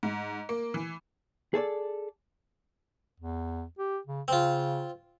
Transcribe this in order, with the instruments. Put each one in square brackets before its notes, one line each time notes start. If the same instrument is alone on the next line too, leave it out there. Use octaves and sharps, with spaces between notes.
[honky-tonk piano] G#2
A#3
E3
[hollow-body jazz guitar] G#4 A4 C#5 D5
[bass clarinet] E2
G4
C#3
[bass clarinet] C#3 [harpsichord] C4 F4